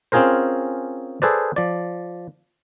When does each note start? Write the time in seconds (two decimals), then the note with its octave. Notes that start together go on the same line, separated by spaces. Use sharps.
0.12 C4 C#4 F4 G#4 A#4 C5
1.22 G#4 A4 B4 C5 D5
1.56 F3 D5